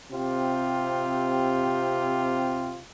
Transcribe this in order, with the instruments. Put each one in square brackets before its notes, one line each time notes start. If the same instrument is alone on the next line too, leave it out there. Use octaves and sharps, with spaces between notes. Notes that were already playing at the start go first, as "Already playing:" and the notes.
[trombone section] C3 C4 F4 G4